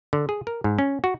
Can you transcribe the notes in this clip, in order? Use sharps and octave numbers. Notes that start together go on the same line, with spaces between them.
D3
G#4
A#4
G#2
C#4
F#4